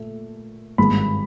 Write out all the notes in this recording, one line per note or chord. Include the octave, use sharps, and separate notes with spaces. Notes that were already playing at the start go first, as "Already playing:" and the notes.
Already playing: A#2 A3
G#1 G2 D#3 G#3 B5